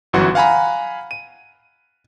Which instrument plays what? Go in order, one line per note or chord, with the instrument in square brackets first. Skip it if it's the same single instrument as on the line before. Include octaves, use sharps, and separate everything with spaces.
[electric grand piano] G1 F#2 E3 F#4 F#5 C6
F5 F#5 G#5 A#5 B5
D#7